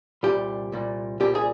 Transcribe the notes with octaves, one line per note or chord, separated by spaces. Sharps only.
C2 A#2 G3 G4
C2 A#2 G3
C2 A#2 G3 G4
G#4